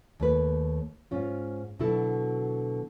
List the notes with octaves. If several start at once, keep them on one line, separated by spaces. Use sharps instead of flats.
D#2 A3 B4
G#2 C#4 F4
B2 D3 F#3 E4 A4